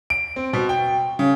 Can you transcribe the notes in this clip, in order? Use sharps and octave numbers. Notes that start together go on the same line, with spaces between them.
D7
C4
B2
G5
C#3